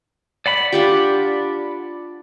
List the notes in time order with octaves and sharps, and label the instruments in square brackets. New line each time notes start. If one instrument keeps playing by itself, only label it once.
[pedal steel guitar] D5 F#5 B5
[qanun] D4 F4 G4